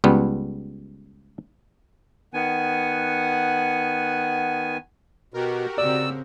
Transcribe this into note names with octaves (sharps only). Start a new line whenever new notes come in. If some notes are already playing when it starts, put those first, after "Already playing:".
C#2 G3 B3
D#3 B3 F#5 G#5
B2 F#4 G4 A#4
C#3 C4 D5 E6